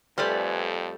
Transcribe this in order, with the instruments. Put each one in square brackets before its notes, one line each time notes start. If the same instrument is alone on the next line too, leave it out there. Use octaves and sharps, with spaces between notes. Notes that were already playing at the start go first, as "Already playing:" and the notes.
[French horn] F2 [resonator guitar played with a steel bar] G3 A3 [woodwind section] B4 G#5 [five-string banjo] C5 D5